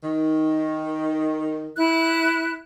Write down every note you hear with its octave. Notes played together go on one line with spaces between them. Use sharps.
D#3
E4 F#6